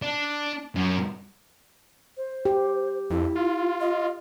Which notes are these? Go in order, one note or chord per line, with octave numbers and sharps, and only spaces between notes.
D4
F#2
C5
G4
F2 E4
F4
D#5